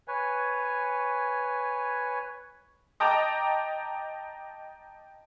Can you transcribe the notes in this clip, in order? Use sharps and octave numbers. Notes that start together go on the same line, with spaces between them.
B4 C#5 G#5
D#5 G5 A5 A#5 D6